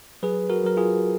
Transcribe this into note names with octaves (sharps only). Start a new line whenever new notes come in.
F#3 G#4 B4
F#4 A#4
F#3 A#4
F4 G#4